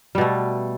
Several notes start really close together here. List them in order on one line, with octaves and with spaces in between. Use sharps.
G3 B2 A3